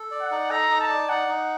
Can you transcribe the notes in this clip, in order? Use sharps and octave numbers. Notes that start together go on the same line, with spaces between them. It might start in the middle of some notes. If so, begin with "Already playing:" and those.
Already playing: A4
D5
F#5
D#4
A4 A#5
D#4
A5
D5
D#4 F#5
D#4